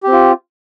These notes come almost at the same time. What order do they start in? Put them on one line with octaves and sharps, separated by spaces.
G4 C4 F4